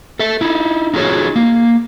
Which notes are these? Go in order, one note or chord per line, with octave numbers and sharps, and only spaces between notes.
A4 E5
D#4 E4
D#4 F4 F#4 G#4 B4 C#5
A#3